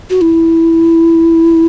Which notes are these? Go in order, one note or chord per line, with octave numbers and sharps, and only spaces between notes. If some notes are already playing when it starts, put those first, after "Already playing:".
F#4
E4